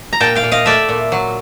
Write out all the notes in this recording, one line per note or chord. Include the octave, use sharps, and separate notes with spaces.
A#5
A#2 G5 A5
F5 G5
A#2
D#5 F5
A3 D5 E5
A#2
F#3